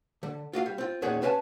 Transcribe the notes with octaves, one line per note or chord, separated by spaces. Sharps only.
D3
F4 F#4 D#5 F5
G3
C4 F4
E2 A#2 D#3 C#4 G#4 F#5
C#4 B4 D#5 F5 G#5 A5